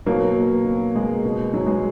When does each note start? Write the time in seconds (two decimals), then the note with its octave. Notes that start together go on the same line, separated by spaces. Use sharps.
0.06 B2 F#3 A#3
0.36 B2
0.65 B2
0.95 B2 G#3
1.25 B2
1.53 B2 F#3
1.66 G#3